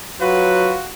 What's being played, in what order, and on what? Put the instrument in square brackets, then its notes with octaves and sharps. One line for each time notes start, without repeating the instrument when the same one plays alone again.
[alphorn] F#3 [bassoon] F4 [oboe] F#4 [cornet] B4